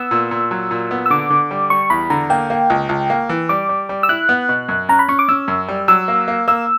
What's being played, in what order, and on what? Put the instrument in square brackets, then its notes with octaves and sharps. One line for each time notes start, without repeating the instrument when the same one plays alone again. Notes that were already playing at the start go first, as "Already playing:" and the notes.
Already playing: [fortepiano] B3 [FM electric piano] E6
[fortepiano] A#2
A#2
F#3
A#2
B3
[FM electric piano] E6
[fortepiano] D3 [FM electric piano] D6
[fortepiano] D3
G3
[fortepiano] G3 [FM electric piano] C#6
[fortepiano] E2 [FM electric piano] B5
[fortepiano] D3 [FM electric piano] A#5
[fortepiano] A#3 [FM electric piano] G5
[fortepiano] A#3
C#2
C#2
A#3
E3
[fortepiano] G3 [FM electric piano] D6
[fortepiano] G3
G3
[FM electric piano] E6
[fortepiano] E4 [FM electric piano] F#6
[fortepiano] B3
B2
F#2
[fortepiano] C#4 [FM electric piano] A#5
[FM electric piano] B5
[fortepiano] C#4 [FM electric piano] C#6
[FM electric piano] D6
[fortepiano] C#4 [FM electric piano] E6
[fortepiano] F#2
G3
[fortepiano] F#3 [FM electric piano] E6
[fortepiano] A#3
A#3
[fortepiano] A#3 [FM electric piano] E6